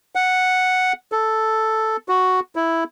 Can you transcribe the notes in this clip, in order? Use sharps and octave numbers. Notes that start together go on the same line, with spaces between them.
F#5
A4
F#4
E4